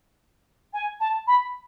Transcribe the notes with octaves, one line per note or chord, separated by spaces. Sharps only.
G#5
A5
B5